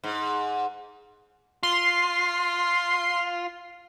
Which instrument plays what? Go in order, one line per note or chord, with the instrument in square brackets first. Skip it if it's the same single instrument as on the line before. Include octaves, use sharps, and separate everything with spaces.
[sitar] G#2
[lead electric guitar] F4 [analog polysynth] C6